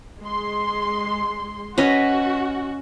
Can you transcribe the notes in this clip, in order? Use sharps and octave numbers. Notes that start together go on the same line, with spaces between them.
G#3 C6
C#4 F#4 B4 D#5